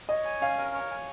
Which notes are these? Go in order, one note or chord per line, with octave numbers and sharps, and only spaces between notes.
C#5 D#5
G#5
C#4 F5
A#4
C#5
G#5